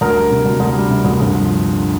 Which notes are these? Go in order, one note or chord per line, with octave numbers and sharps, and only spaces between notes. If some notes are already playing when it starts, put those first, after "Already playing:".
D2 A#4
G3
C3
D2
D2
G3
C3
D2
G1
F3